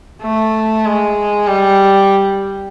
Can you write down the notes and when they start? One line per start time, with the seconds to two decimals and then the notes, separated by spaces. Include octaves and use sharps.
0.23 A3
0.85 G#3
1.47 G3